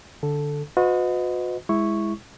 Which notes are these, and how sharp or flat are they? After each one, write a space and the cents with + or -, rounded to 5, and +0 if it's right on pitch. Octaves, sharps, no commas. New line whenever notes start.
D3 +0 A4 +0
F#4 -40 B4 +35 D#5 +0
G#3 -10 E4 +0 C#6 +0